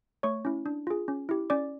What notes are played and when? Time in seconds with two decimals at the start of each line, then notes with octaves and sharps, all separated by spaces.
0.23 A3 C#5 C#6
0.45 C#4 E4
0.66 D4
0.87 F4 G#4
1.08 C#4
1.29 E4 G4
1.50 C#4 D5 D6